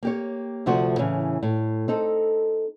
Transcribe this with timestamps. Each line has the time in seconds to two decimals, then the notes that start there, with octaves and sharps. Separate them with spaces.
0.03 A#3 G4 C#5
0.66 D2 C3 F3 A3 F#4 C5
0.98 A2 C#3 E3
1.43 A2
1.88 C4 D#4 A4